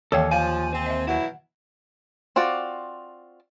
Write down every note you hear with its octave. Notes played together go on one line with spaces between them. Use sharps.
D#2 D#3 E3 A4 C#5 F5 G5
F3 F5 G#5
C4
D#5 E5
B2 F#3 E4 F#5
C4 F4 F#4 D5